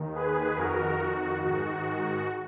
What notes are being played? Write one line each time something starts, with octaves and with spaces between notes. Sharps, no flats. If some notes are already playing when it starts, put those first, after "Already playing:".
Already playing: D#2 D#3
G#4 B4
F2 D#3 F#4 A#4
F#4
G#2 D#3 F#4